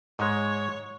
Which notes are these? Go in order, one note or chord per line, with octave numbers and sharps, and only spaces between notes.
G#2 G#3 C#5